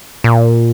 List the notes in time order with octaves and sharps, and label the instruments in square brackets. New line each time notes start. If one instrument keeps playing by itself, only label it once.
[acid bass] A#2